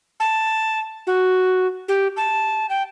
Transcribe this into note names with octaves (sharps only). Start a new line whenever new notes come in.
A5
F#4
G4
A5
G5